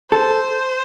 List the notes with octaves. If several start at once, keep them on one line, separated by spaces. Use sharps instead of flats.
A4 C5